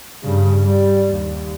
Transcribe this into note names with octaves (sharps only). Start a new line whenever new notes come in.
G2 C#3
G3
D#2